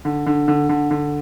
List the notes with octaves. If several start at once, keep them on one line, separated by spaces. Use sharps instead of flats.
D3
D3
D3
D3
D3